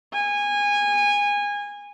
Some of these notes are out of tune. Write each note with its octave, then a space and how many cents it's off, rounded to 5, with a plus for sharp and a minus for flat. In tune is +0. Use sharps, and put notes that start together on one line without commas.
G#5 -20